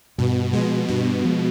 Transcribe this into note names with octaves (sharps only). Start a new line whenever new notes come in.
G2 B2
B2 F3 G#3
G2 B2
F3 G#3